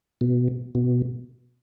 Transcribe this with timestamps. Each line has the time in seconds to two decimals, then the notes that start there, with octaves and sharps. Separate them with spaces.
0.21 B2
0.75 B2